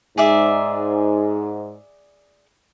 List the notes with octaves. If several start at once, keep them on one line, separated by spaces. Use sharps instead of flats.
G#2 G#4 D5 E5